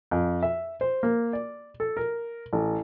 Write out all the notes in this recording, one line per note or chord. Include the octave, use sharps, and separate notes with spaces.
F2
E5
C5
A#3
D5
A4
A#4
A1